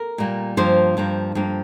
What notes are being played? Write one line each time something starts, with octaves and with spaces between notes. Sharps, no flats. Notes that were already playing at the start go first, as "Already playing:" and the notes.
Already playing: A#4
A#2 G3 A#3
G2 F3 A#3 C5
G2 F3 A#3
G2 F3 A#3